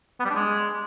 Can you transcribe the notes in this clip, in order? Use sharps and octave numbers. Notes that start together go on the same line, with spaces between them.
B3
G3
D4
G#3